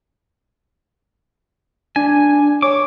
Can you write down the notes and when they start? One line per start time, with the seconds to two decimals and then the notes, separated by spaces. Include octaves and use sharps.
1.96 D4 G#5
2.62 C#5 D6